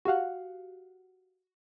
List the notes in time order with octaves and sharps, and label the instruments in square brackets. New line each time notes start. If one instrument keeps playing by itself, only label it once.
[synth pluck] F#4 G4 F5 F#5